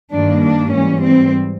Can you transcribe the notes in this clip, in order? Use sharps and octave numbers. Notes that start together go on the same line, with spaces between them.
G2 D#3 G3 A#3 D4
D4
G#2 E3 G3 C#4
C4